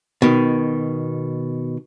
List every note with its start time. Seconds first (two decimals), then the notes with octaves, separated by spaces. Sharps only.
0.22 B2 D#3